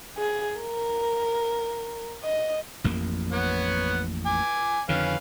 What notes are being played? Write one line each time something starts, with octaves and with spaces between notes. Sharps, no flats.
G#4
A#4
D#5
A1 F2 A#3
B3 C#5 F#5
G#5 D6
F2 D3 D#3 C#4 B4 F5